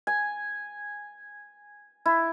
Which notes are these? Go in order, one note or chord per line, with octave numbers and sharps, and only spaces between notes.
G#5
E4